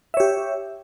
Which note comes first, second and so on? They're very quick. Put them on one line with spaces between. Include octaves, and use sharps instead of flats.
E5 C#5 G4